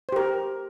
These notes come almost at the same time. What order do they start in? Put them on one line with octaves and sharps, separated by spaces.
C5 G4 A#4